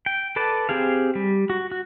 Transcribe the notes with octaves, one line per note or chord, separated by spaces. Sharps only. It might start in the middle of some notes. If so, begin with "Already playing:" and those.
G5
A4 B4 D5 A5
C4 G4 G#4 F5
G3
F#4
F#4